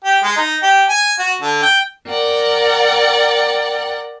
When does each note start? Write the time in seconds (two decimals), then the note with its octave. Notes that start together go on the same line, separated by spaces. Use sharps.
0.04 G4
0.23 G#3
0.37 D#4
0.62 G4
0.90 G#5
1.19 F#4
1.42 D3
1.63 G5
2.09 A#4 D5 F#5 G5